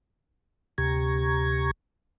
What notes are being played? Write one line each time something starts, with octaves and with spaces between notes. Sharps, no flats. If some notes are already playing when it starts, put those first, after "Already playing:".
D2 C3 G4 A#5 C#6 G#6